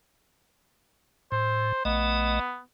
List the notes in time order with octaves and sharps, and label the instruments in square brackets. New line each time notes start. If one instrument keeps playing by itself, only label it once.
[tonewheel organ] A2 [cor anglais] C5
[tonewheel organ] A#1 A3 D#5 [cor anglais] B3